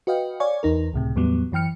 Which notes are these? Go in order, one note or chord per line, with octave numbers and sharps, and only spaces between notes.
F#4 B4 D#5 F5 G5
C#5 D5 F5 G#5 C#6
E2 D#4 A#4
C#2 A2 C3
E2 A2 F#3 G3 B3
F#2 E3 G5 F6 C#7